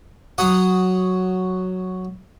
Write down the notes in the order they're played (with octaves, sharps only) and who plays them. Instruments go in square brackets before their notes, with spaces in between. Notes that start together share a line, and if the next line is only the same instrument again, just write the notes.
[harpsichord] F#3 F#4 F#5 D#6